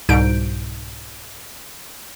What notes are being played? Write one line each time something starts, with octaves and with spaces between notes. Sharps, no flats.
C2 G#2 B2 G6 D7